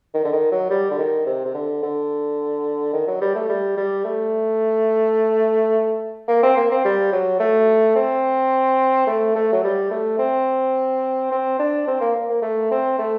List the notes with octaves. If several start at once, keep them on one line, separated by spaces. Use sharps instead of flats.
D#3
D3
D#3
F#3
G3
D3
D#3
C3
C3
D3
D3
D#3
F#3
G3
A3
G3
G3
A3
A#3
C4
A#3
C4
G3
F#3
A3
C4
A3
A3
F#3
G3
A3
C4
C4
D4
C4
A#3
A#3
A#3
A3
C4
A3